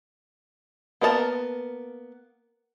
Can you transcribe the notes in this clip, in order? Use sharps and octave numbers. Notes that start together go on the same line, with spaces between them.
A#3 B3 A#4 D5 A5